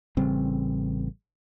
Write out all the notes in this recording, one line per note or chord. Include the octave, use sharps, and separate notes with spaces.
A1 C#3 G3 C4